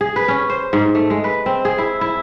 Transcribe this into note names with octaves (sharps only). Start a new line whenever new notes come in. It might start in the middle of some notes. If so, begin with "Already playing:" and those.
G#4
B4
C#4
C5
G#2
A3
G#3
B4
C4
G#4
E4
E4